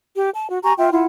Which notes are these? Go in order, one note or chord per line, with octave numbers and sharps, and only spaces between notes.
G4
A5
F#4
G4 G#5 A#5 C#6
F4 E5 G5
E4 F4 F#5